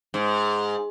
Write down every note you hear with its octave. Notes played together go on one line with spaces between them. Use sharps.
G#2